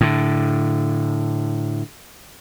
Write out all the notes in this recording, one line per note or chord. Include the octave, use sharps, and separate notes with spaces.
A2 D3